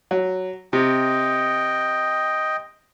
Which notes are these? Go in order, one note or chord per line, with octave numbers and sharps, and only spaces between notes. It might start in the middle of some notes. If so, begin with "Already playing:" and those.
F#3
C3 D#5 G5